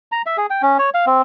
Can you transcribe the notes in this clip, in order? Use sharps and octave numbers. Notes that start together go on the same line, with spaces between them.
A#5
E5
G#4
G5
C#4
C#5
F5
C4